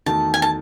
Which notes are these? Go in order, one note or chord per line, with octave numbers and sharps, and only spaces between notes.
E2 D#3 A3 D#4 F#4 A5
G#5
A5